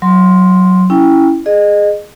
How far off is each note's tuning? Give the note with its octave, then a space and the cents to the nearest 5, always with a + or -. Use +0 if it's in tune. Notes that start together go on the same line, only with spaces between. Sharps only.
F#3 +0 C6 +0
C#4 +15 E4 +0 G5 +15
G#4 +0 D#5 -25